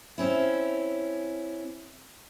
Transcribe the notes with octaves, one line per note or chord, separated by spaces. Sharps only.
C4 C#4 E4